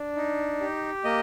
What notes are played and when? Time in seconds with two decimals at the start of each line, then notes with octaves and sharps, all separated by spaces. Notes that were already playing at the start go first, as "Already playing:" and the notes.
Already playing: D4
0.16 D#4
0.61 G4
1.04 A#3 D#5